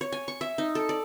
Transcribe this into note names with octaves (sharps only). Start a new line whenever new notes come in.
C#5
G#5
C#6
E5
D#4
A4
D5